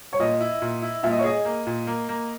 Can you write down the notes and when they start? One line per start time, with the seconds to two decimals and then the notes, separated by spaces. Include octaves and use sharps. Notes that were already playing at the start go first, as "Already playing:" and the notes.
0.13 C#5
0.20 A#2 D#5
0.40 E4
0.62 A#2
0.82 E4
1.03 A#2 E5
1.11 D#5
1.19 C#5
1.24 G#4 D#5
1.45 A#3
1.67 A#2
1.87 A#3
2.09 A#3